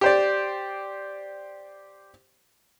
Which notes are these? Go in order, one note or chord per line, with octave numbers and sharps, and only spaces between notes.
G4 C5 D5